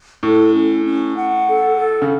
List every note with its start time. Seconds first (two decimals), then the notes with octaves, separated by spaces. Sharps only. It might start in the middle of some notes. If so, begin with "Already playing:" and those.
0.23 A2 A4
0.54 C#4
0.85 C#4
1.15 F#5
1.46 A4
1.77 A4
2.02 C#3